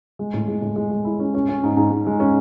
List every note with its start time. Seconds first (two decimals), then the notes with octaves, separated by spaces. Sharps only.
0.19 G#3
0.34 A2
0.48 G#3
0.62 A2
0.76 G#3
0.91 G#3
1.05 E4
1.20 C#4
1.34 C#4
1.49 C#4
1.63 G#2
1.77 G#2
1.91 G#2
2.07 G#3
2.20 C#4